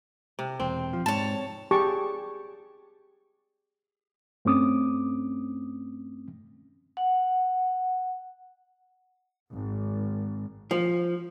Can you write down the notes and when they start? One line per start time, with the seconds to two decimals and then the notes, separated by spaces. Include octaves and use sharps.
0.39 C3
0.60 E1 C4
0.93 F3
1.06 G#2 C#5 A5
1.71 G4 G#4 A5 C#6 D6
4.45 G2 A3 C4 C#4 D6 D#6
6.97 F#5
9.52 G#1
10.71 F3